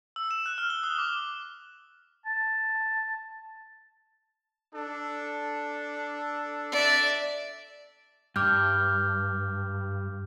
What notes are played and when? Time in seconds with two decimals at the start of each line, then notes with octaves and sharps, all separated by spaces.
0.16 E6
0.31 E7
0.46 F#6
0.58 F6
0.70 G7
0.83 D#6
0.98 D6
2.25 A5
4.74 D4 A4
6.72 D5 E5
8.36 G2 D6 F6 G6